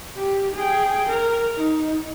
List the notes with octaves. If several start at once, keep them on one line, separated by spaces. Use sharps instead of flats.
G4
G#4 G5
A#4
D#4